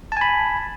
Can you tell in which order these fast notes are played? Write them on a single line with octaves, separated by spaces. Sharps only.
A5 G#5 B5